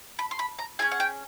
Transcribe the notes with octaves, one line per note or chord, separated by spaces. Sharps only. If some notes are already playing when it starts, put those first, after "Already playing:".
B5
C6
B5
A#5
C#4 F4 G#4 G#5
F#5
G5